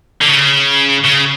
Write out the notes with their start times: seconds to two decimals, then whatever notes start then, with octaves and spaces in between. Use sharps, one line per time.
0.21 D3
0.28 C#3
1.05 C#3